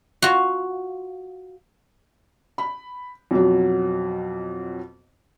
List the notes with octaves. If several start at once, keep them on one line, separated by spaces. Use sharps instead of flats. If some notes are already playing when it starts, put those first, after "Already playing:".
F4 F#4
B5
F2 B2 F#3